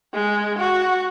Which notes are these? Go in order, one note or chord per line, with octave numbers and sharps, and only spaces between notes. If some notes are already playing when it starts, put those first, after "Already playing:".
G#3
F#4